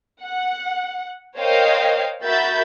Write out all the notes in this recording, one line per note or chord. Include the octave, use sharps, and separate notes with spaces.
F#5
A#4 C5 C#5 D#5 F5 G5
F#4 A#4 E5 B5 G6 A6